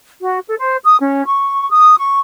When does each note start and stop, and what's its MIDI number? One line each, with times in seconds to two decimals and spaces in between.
0.22 0.39 66
0.47 0.56 69
0.59 0.77 72
0.84 0.97 87
0.99 1.26 61
1.26 1.71 85
1.71 1.96 87
1.98 2.19 85